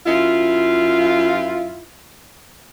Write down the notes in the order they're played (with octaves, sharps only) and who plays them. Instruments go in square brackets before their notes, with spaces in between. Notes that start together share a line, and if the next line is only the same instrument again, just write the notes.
[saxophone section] F#2 E4 F4